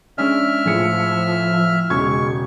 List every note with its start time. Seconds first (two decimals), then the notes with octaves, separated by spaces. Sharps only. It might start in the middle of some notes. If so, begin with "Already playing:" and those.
0.18 G#3 C#4 D4 E5 F6
0.66 A2 F3 G#4 C#7
1.90 E1 C#3 G#3 C#6 G#6